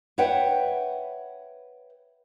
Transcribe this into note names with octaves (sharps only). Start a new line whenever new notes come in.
B4 C#5 E5 F#5 G5